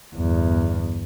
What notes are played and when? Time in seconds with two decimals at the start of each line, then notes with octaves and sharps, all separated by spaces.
0.16 G1 E2